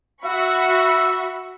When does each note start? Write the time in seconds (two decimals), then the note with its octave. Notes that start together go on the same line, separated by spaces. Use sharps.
0.24 F#4 E5 B5 C#6